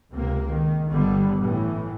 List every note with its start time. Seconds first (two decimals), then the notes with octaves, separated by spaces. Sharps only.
0.13 C#2 C3 A#3
0.49 D#3
0.90 G1 D3 G3 B3
1.41 A2 E3